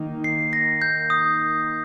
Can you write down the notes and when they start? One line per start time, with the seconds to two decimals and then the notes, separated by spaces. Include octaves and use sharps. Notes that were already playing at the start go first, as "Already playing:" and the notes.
Already playing: D#3 A#3 D#4
0.24 C7
0.53 A#6
0.82 G6
1.10 D#6